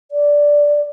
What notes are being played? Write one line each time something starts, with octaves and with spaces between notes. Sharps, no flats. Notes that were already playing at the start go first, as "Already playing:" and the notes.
D5